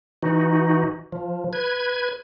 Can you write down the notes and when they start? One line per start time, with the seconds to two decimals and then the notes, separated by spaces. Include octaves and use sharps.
0.23 E3 D#4 F#4
1.12 F3
1.53 B4 G#6